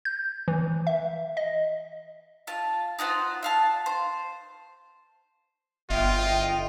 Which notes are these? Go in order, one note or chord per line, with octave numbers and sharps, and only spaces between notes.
G6
E3
E5
D#5
F4 A5
D#4 F4 F#4 C5
E5 F5 A5
C5
G1 F4 D#5 E5 G5